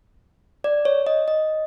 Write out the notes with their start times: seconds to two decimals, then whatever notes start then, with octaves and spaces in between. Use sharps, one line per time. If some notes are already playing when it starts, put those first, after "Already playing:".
0.64 D5
0.85 C#5
1.07 D#5
1.28 D#5